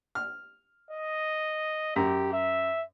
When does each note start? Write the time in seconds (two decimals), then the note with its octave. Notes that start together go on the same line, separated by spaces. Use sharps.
0.15 F6
0.91 D#5
1.96 F#2 G4
2.33 E5